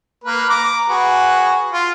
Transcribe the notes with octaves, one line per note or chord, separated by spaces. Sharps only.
A#3 A#4 B4
A#5 D6
F#4 G#4 B4
F4